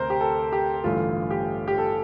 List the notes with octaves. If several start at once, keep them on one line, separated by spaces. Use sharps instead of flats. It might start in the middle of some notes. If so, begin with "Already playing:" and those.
Already playing: D2 C3 A#4 C5
G4
A4
G4
A1 G2 D3 A3 F4
G4
G4
A4